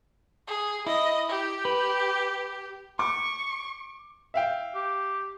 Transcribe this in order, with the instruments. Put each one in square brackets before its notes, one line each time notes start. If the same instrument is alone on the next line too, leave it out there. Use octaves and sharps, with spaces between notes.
[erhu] G#4
[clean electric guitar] E4 [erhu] D#5
[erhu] G4
[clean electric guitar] B4
[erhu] C#6 [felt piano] D6
[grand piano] E5 F5 G5
[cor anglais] G4